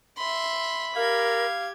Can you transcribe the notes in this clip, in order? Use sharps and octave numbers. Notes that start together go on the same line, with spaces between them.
E5 B5 C6
G4 A#4 F5 G#6